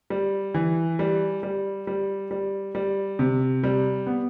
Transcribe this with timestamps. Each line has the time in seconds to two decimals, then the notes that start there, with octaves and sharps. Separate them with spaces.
0.10 G3
0.54 E3
0.99 G3
1.43 G3
1.87 G3
2.31 G3
2.75 G3
3.19 C3
3.63 G3
4.07 B3